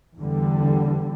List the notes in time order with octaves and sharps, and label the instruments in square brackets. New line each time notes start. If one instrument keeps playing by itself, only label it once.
[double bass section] E2 D3 G3